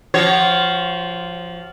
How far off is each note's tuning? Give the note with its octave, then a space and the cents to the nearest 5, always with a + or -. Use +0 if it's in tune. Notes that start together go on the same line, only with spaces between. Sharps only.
F3 -5 F#4 +30 C#5 -10